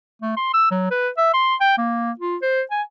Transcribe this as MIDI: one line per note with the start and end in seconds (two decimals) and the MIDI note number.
0.22 0.33 57
0.37 0.52 84
0.54 0.68 88
0.71 0.87 54
0.91 1.09 71
1.18 1.32 76
1.34 1.55 84
1.61 1.77 79
1.78 2.11 58
2.20 2.37 65
2.42 2.62 72
2.71 2.82 80